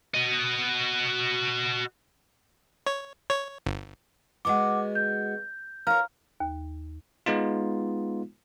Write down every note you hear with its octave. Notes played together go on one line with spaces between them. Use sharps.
F#4 D#5
C#5
C#5
G1
G#3 B3 F#4 F#5 D6
G6
A#4 C#5 F5 A#5 F6
D#2
G#3 B3 D#4 F4